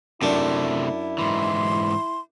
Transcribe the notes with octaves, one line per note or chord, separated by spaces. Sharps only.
F#2 C3 A3 D4 E4
G#2 E3 C6